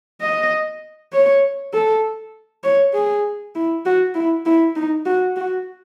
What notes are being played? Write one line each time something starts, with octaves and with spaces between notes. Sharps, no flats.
D#5
C#5
A4
C#5
G#4
E4
F#4
E4
E4
D#4
F#4
F#4